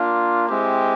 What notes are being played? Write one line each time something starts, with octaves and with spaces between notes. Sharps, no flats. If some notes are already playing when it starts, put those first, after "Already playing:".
Already playing: A#3 D4 F4
G#3 C4 E4 G4